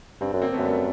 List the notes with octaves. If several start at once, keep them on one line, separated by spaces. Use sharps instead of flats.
G2 C4 D4
F#2
A#3 C4
A3 B3
F#2
G3 A3